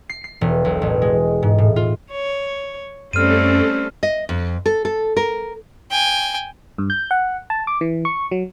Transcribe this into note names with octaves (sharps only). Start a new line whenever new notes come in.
C7
C7
E1
B1
A1
G#3
G#2
A2
F4
C#5
F#2 G3 A3 C4 C#4 A4 F6 D#7
D#5
F2
A4
A4
A#4
G5 G#5
G2
G6
F#5
A5
D6
E3
C#6
F#3